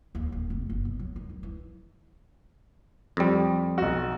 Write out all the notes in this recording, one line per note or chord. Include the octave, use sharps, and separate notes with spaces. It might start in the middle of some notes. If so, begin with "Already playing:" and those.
D#2
D#1
F1
F#1
B2
F#3
D#3
C#2
E3
F2 G3
B1 F#4